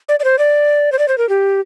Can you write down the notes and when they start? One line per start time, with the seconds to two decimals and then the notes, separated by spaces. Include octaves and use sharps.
0.09 D5
0.20 D5
0.24 C5
0.39 D5
0.92 C5
0.99 D5
1.08 C5
1.18 A#4
1.29 G4